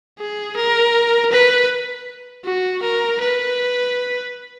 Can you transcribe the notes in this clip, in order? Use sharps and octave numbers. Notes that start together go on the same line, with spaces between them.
G#4
A#4
B4
F#4
A#4
B4